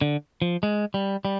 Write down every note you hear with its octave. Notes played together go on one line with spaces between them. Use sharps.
D3
F3
G#3
G3
G3